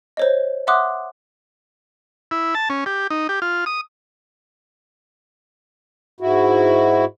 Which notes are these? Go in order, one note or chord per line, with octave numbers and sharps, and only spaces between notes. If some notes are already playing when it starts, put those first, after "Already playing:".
C5 C#5 D#5
E5 F#5 C6 D6 D#6 F#6
E4
A5
C#4
G4
D#4
G4
F4
D#6
G#2 E4 F#4